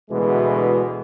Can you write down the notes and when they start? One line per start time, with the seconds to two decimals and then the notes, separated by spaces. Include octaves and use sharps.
0.11 D2 B2 E3 G#3